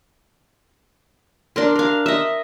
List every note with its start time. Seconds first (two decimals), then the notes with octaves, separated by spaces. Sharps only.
1.56 D4 A#4 C6
1.75 A#4 F5
2.06 D#5 E5